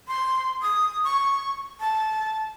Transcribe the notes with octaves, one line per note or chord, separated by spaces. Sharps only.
C6
D#6
C#6
A5